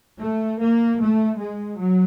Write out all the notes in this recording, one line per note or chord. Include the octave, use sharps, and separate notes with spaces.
A3
A#3
A3
G#3
F#3